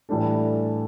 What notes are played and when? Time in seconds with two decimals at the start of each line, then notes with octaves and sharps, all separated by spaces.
0.09 A2 E3 G3 D4 A4